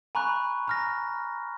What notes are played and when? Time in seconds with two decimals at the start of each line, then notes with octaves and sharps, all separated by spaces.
0.15 G#5 A#5 B5 C#6 F#6
0.67 A#5 F6 A#6